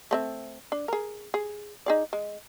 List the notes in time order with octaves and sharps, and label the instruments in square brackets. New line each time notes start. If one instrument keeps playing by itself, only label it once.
[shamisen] A3 C4 E5
D4
G#4 A#4
G#4
D#4 G#4 D5
G#3